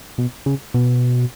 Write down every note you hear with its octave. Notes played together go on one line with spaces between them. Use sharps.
B2
C#3
B2